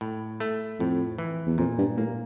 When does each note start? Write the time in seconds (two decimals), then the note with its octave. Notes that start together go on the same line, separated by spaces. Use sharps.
0.01 A2
0.40 A3
0.79 F2 A2
1.18 E3
1.47 E2
1.58 F2 A#2
1.78 G2
1.97 A2 A#3